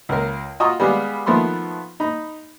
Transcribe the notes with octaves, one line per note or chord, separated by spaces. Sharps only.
C#2 A#4
F4 F#4 D#5 A#5 C#6 D#6
G3 G#3 B3 G4 G#4 F5
D#3 F3 A3 B3 B5 C6
D#4 B5